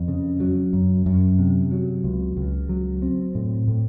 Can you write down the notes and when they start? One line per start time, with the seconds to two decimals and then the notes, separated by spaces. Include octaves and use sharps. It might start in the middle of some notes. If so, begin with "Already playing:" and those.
Already playing: F2
0.08 C#3
0.40 F#3
0.73 F#2
1.06 F#2
1.39 C3
1.72 F#3
2.04 C#2
2.37 C#2
2.69 F#3
3.02 C4
3.35 A2
3.68 A2